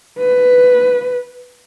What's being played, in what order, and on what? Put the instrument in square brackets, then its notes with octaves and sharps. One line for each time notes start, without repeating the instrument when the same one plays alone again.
[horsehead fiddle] B4